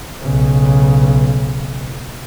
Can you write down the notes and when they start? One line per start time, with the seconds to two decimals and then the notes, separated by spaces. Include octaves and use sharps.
0.21 B1 C#3